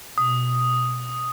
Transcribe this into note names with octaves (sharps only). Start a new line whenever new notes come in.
B2 D#6